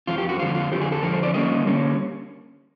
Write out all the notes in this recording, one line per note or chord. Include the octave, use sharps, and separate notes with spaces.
F2 D3 F4
F3
G4
F#4
F2 D3 F3 F4
F4
F2 D3 F3 G4
G#4
A4
F2 D3 F3 A#4
C5
D5
D3 G3 A#3 C#4 D#5
D3 G3 A#3 C#4